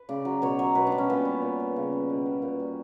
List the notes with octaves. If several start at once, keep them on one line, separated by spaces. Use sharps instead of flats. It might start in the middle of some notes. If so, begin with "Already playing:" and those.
Already playing: B4
C#3 D5
F#3
B2 C#5
F#3
B2 B4
D4
G3
C#4
A#2 B3
G3
A#2
G3
C#3
G3
B2
G3
A#2
G3